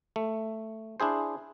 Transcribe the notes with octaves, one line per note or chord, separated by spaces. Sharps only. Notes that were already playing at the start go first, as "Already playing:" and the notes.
A3
D4 E4 G#4 C5